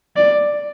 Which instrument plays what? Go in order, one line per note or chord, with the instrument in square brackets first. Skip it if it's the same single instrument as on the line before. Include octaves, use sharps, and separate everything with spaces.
[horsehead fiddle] D5